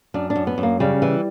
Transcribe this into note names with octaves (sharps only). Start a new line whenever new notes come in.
F#2 D4
D4
F#2
B3
F#2
A#3
C#3 G3
E3